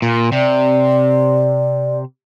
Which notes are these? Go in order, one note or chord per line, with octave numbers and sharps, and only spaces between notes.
A#2
C3 D5